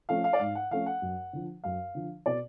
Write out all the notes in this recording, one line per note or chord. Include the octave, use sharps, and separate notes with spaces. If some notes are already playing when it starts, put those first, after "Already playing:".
F3 A3 C#4 F5
F5
D5
G#2 F5
F#5
F3 A3 C#4 F5
F#5
F#2
D3 F3
F#2 F5
D3 F3
B2 D5